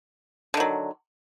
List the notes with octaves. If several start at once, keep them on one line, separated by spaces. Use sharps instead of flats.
D3 D#3 F#3